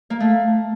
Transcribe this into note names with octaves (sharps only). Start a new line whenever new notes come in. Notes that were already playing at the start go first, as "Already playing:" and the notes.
A#3
A3